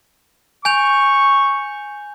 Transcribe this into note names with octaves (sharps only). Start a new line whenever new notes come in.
G#5 C#6 G6 F7